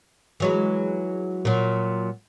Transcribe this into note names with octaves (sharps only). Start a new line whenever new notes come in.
E3 F#3 G#3
A#2 F#3